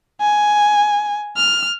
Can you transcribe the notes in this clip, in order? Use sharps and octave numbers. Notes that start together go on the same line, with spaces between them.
G#5
F6